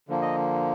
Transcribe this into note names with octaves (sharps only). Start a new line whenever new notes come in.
D3 F3 A#3
D#5